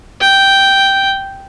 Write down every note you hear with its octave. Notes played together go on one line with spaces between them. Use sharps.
G5